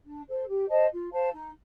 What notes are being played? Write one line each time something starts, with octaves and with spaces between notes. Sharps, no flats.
D4
A4 C5
G4
C5 D#5 A5
F4
C5 F5 A5
D#4